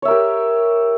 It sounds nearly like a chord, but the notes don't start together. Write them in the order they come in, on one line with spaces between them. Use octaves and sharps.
C#5 E5 A#4 G4